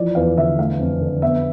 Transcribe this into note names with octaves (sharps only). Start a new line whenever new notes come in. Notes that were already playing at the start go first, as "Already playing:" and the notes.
Already playing: E3 F3 D5
E2 F5
D3 E5
A3 F5
F2
D3
B3 E5